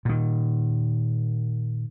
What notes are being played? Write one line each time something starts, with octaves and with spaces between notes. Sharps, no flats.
A#2 D#3